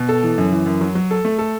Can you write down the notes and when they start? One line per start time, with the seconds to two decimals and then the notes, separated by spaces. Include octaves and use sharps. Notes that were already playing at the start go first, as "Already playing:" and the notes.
Already playing: B2
0.09 A4
0.23 E3
0.38 F#2
0.52 E3
0.66 F#2
0.81 F#3
0.95 F#3
1.11 A4
1.25 A3
1.39 A4